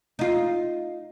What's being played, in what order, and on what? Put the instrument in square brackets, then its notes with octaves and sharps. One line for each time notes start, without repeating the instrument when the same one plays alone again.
[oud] D#4 F4